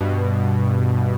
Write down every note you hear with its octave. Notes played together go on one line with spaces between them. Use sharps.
G2 B2